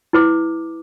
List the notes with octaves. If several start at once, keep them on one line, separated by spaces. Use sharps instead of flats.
E4 B4 D6